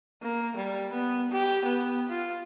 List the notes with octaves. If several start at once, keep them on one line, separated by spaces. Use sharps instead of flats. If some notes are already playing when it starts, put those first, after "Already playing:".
A#3
G3
B3
G4
B3
F4